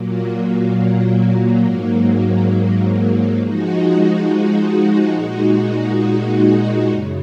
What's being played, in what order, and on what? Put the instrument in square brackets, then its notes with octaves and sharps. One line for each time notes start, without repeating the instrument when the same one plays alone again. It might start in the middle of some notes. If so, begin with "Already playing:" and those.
Already playing: [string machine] A#2 F#3 A#3
G#2 F#3 A#3
F3 G#3 D#4 F#4
A#2 G#3 D#4 F#4
F#2 C#3